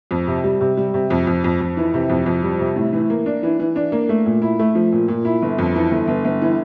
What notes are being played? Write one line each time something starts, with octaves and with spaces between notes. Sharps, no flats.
F2
C3
G3
C3
G3
C3
F2
F2
F2
F2
E3
C3
F2
F2
G3
C3
A2
E3
A#3
D4
E3
E3
D4
A#3
A3
A#2
E4
A3
F3
A#2
A#2
E4
G1
F2
E3
G1
G1
G1
E3